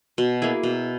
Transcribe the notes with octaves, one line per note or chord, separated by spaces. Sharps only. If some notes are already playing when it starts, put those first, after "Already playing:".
B2
A#3 E4 G#4
B2